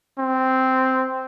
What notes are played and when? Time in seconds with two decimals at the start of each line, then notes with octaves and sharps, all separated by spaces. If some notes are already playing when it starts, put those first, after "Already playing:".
0.18 C4